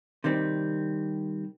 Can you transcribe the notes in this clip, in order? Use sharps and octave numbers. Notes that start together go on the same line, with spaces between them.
C3 D#3 G3 C4